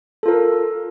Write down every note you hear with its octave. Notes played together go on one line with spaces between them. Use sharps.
F4 A4 A#4